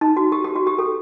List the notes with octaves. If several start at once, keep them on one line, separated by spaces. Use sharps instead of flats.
D#4
F#4
G4
G4
F#4
G4
A4